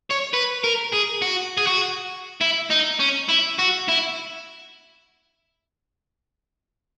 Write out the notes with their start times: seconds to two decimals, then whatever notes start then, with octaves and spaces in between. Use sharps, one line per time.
0.11 C#5
0.34 B4
0.64 A#4
0.92 G#4
1.22 F#4
1.58 G#4
1.67 F#4
2.41 E4
2.70 D#4
3.00 C#4
3.29 E4
3.59 F#4
3.89 E4